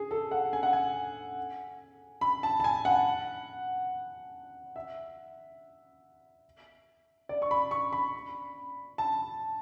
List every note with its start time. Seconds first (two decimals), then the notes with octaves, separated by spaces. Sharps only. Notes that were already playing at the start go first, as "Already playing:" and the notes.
Already playing: G#4
0.11 A4
0.31 F#5
0.53 G#5
0.63 F#5
0.73 G#5
2.21 B5
2.43 A5
2.60 A5
2.64 G#5
2.85 F#5
4.76 E5
7.29 D5
7.42 C#6
7.51 B5
7.71 C#6
7.93 B5
8.98 A5